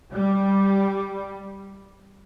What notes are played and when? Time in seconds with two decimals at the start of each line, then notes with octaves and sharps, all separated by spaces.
0.13 G3